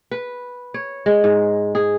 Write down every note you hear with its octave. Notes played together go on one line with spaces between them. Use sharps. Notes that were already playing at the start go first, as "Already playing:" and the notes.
B4
C#5
G#3
G#2
G#4